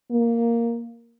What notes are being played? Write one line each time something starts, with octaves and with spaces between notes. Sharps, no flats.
A#3